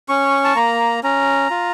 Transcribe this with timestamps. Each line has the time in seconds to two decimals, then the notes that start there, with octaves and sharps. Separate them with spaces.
0.09 C#4 C#6
0.44 A5
0.55 A#3 A#5
1.03 C#4 A#5
1.50 F4